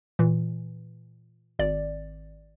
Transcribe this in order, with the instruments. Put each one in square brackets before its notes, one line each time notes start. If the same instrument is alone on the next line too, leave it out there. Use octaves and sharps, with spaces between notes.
[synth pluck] A#2 E3
G#1 D5